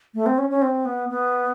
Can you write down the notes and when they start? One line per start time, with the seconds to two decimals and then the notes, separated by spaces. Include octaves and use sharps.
0.14 A3
0.26 C4
0.38 C#4
0.50 C#4
0.62 C4
0.85 B3
1.09 B3